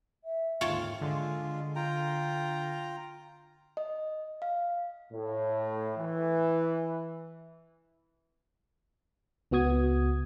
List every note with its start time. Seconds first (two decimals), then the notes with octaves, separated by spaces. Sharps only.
0.24 E5
0.61 D#2 G#2 D3 F4 C#5 G5 A5
1.01 D3 G#3 F4
1.76 F4 G5 A#5
3.77 D#5
4.42 F5
5.13 A2
5.97 E3
9.51 C#2 B3 F#4 D#6 G#6